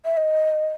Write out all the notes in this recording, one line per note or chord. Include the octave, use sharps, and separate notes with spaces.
E5
D#5